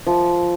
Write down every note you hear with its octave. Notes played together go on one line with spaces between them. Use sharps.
F3